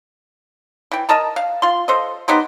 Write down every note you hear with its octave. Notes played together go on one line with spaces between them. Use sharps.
E3 G5
A#4 D#5 A5 A#5
F5
F4 C6
A4 C5 D#5
B3 D#4 G4 C5